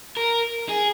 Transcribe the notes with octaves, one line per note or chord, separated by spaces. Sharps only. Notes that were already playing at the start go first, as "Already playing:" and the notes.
A#4
G#4